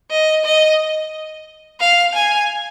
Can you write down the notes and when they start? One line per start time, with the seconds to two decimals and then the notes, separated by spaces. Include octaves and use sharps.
0.11 D#5
0.45 D#5
1.80 F5
2.15 G#5